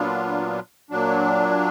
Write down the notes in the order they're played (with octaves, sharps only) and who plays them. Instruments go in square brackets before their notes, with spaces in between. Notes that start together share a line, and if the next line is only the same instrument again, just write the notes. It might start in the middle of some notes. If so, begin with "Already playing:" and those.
Already playing: [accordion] A#2 F#3 B3 D4 F4
A#2 F#3 D4